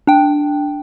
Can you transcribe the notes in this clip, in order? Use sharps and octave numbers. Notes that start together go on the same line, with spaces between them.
D4 G5